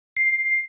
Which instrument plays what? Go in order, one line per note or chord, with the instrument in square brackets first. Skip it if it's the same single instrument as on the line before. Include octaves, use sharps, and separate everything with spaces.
[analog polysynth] C7